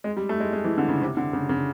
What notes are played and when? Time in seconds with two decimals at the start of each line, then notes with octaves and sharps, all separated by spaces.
0.04 G#3
0.16 G3
0.29 A3
0.40 G#3
0.53 G#3
0.64 E3
0.78 D3
0.89 C#3
1.02 C3
1.17 D3
1.33 C#3
1.49 C#3